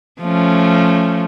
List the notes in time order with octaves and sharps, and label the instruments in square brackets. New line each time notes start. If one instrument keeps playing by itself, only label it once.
[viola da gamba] F3 A3 C#4